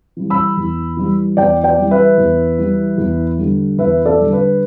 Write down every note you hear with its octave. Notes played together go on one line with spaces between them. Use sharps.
E3 G3
B5 E6
E2
E3 G3
E2 D5 G5
D5 G5
E3 G3
B4 E5
E2
E3 G3
E2
D3 G3
E2 B4 E5
A4 D5
D3 G3
B4